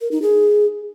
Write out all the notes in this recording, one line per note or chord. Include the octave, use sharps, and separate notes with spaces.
A#4
D#4
G#4